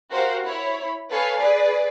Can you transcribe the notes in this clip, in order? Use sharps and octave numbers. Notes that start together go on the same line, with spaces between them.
F#4 G4 A#4 C5 F5 F#5
E4 C#5 B5
A4 B4 C#5 F5 G#5
G#4 B4 D5